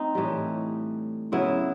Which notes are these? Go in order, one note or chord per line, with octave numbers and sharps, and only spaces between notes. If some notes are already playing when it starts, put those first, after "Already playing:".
Already playing: A3 C4 D#4
A2 E3 G3
C#3 F#3 B3 E4